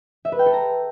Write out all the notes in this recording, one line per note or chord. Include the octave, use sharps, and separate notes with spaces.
E5
B4
G5
A4
A#5